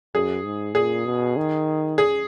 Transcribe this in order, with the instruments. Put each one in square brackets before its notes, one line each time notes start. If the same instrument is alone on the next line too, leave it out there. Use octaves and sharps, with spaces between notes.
[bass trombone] F#2 [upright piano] G#4
[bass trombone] G#2
[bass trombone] A#2 [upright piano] G#4
[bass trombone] B2
D#3
[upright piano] G#4